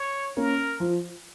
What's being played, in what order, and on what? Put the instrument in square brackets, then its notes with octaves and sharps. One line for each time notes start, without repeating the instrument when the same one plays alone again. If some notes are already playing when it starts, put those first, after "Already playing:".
Already playing: [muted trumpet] C#5
[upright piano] A#3 C#4 [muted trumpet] A#4
[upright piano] F3